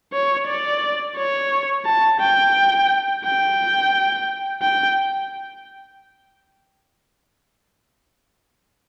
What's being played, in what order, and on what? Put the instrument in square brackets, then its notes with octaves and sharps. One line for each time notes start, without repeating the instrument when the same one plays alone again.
[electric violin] C#5
D5
C#5
A5
G5
G5
G5